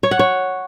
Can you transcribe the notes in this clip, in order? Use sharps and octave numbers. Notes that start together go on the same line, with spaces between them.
C#5
F#5
C#5